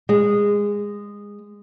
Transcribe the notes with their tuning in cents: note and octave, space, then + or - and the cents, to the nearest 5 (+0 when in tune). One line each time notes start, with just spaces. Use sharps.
G#3 -20